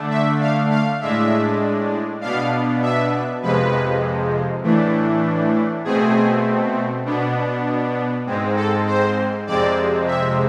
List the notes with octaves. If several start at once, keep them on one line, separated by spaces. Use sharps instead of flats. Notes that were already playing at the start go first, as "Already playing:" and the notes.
Already playing: D3 A3 D4
E5
F5
F5
A2 G#3 D4 E5
B2 B3 D4 F5
E5
F2 C3 F3 G#3 B4
A2 E3 A3 D4
B2 A3 C4 G#4
B2 B3 D4
G#2 G#3 C4
A4
C5
F2 C3 G#3 C4 D5
E5